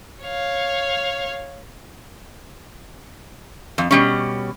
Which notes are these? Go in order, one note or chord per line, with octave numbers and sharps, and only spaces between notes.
C#5 F5
F2
B2 G3 C#4